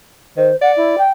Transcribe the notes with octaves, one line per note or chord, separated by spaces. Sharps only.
D#3 C5
D5 F#5
E4
G5